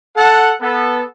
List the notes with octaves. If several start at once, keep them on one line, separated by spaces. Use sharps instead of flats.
A4 F#5
B3 A4